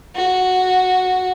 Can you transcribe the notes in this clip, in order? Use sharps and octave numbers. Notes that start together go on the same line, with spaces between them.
F#4